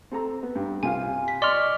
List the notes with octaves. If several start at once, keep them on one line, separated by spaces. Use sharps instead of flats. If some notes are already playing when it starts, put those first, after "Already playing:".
C4 A4 A#5
B3
G2
C2 F4 F5 G#5
B6
D5 D#5 C6 C#6 F6